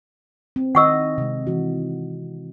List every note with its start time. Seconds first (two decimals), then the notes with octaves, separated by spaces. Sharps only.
0.56 C4
0.75 D#3 D#5 F#5 C#6 E6
1.18 C3 G#3
1.47 E3 F#4